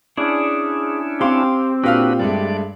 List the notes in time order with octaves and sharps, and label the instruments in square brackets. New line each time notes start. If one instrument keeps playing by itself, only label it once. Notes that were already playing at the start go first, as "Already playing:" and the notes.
[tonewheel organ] C#4 D4 E4 [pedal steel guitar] G#4 D5
[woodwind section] C4 [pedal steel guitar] G4 C6 D6 [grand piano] F5
[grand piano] A#2 F5 F6 [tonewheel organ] D4 F#4 B4 [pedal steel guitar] G4
[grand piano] G2 G#3 A3 [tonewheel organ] D5